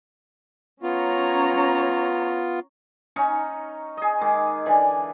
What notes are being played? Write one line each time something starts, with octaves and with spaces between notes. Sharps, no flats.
B3 C#4 F4 C#5 A#5
C#4 D#4 A#5 C#6
G#4 D#5
D#3 G#3 D6
D3 E3 D5 G#5